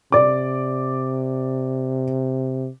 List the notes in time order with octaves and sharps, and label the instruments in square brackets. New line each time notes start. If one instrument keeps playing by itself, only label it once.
[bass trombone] C3 [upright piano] D5 D6